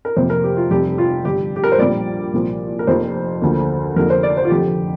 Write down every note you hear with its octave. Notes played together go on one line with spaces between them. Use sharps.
A#4
F2 C3 A#3 C5
A#4
G4
F4
F1 F2 C3 G3 G4
F4
G1 G2 G3 G4
G4
A#4
C5
A#1 A#2 G3 A#3 D5
C2 A#2 F3
A#4
F1 F2 F3 A#3 C5
D2 D3 F3 A#3
F1 F2 D3 A#3 A#4
C5
D5
C5
F4
F1 F2 D3 G4